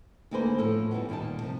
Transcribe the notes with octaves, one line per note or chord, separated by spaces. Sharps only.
D2 D3 A#3 G#4 B4 C5
E2 A2 F3 E4 A4
G2 E3 G3 B3
D#2 A#2 D#3 G3 A5
C3 F3